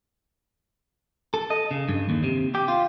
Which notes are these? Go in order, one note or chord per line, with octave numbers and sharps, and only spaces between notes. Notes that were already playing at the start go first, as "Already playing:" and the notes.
A4
D#5
C#3
G2
D#2
C3
G4
F4